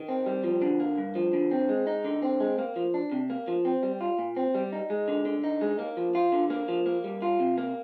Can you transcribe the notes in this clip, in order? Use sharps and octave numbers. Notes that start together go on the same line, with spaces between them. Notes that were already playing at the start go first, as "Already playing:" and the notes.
Already playing: D#3
C4
G3
F3
D3
A#3
G2
F3
D3
C4
G#3
D#4
D3
C4
G#3
A#3
F3
D4
C3
A#3
F3
C4
G3
F4
A#2
C4
G3
D#4
G#3
D3
D3
D#4
G#3
A#3
F3
F4
D3
A#3
F3
A#3
G3
F4
C3
A#3